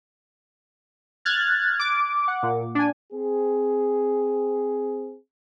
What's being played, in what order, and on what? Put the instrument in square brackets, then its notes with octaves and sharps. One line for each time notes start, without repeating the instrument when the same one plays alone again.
[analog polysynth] F6 F#6 G#6 A6
D6
F#5
A#2
D4 G#5
[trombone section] C4 G#4